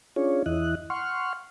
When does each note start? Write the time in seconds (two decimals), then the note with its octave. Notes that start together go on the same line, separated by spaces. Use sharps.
0.16 C#4 D4 F4 G#4 C#5
0.46 E2 E3 E4 D#5 F#6
0.90 F#5 C6 C#6 F6